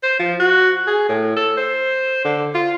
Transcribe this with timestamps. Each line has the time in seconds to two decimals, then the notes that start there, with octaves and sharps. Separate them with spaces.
0.03 C5
0.19 F3
0.40 F#4
0.87 G#4
1.09 A2
1.37 A4
1.57 C5
2.25 D3
2.55 F4